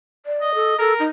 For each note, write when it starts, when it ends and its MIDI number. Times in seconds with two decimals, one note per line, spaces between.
0.26 0.52 74
0.41 0.77 75
0.55 0.75 69
0.79 0.94 69
0.79 1.03 70
1.00 1.07 63